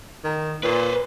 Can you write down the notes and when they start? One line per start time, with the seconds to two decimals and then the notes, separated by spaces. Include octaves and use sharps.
0.24 D#3
0.63 A#2 B4 C5